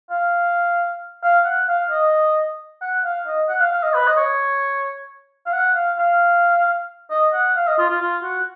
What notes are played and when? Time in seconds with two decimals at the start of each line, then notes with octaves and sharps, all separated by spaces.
0.10 F5
1.24 F5
1.45 F#5
1.68 F5
1.91 D#5
2.81 F#5
3.04 F5
3.27 D#5
3.49 F#5
3.60 F5
3.72 F5
3.83 D#5
3.94 B4
4.08 D#5
4.17 C#5
5.46 F5
5.53 F#5
5.75 F5
5.98 F5
7.10 D#5
7.33 F#5
7.56 F5
7.67 D#5
7.78 F4
7.90 F4
8.01 F4
8.23 F#4